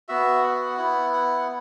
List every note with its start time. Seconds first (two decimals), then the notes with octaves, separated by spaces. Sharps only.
0.08 B3 F#4 E5
0.43 F#5
0.78 B3 E4
1.13 F#5